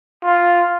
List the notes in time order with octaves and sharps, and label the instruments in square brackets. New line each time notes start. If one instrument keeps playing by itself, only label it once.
[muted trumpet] F4